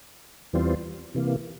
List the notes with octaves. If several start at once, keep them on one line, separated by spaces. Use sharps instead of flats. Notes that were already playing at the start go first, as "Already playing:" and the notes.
E2 E3 G3 C4 F4
C3 E3 A#3